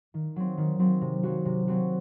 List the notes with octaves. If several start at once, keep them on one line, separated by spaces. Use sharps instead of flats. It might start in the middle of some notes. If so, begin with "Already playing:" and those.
D#3
F#3 C4
D#3
F#3 C4
C3
F#3 C4 F#4
C3
F#3 C4 F#4